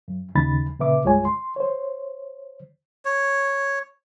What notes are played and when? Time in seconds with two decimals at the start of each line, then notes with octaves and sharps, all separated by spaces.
0.08 F#2
0.35 D#2 C#3 D#4 B5 A6
0.79 A#2 C#3 B4 E5 D6
1.03 C2 G2 G#3 F4 C#5 G#5
1.25 C6
1.56 C5 C#5
3.05 C#5